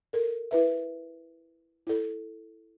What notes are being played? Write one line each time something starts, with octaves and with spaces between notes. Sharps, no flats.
A4 A#4
E4 B4 E5
E4 A4